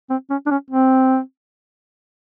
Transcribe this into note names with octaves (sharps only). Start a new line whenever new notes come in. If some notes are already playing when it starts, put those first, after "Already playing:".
C4
C#4
D4
C#4
C4